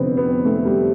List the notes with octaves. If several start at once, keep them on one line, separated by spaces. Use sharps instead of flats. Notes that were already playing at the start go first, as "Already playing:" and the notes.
Already playing: F1 F2 D3 B3 C4
B3
A3
G3